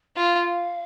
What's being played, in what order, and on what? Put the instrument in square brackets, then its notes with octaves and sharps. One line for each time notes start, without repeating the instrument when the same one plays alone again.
[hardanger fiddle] F4 [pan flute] F5